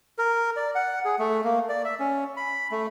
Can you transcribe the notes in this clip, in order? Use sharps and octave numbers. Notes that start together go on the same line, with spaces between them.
A#4
D5
F#5
G#4
A3
A#3
D5
E5
C#4
B5
A3